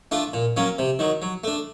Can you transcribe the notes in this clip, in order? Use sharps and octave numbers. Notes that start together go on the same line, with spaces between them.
A3 D4 F4
A#2
F#3 A#3 C#4
C3
D#3 F#3
F#3
A3 D4